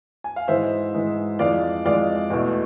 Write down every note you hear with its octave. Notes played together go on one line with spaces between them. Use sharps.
G#5
F5
G#2 E3 G#3 C5 E5
G#2 E3 G#3
F2 E3 G#3 D5 F5
F2 E3 G#3 D5 F5
E2 B2 A3